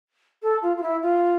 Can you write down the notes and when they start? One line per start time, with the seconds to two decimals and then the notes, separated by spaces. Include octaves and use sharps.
0.43 A4
0.62 F4
0.77 F4
0.83 E4
1.02 F4